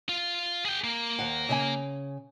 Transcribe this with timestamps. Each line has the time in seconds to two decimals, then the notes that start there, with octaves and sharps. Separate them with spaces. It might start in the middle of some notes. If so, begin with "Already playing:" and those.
0.09 F4
0.65 G#4 G5
0.84 A#3
1.19 D#2 C5 F#5
1.49 C#3 E5 G#5